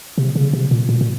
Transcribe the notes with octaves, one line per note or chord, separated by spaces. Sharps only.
C3
C#3
C3
A#2
A#2
A#2